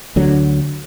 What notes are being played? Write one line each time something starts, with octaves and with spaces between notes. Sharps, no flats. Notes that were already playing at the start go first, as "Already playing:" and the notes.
D2 D3 F#3